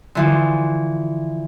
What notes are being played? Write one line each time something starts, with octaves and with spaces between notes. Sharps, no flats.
D3 E3 F3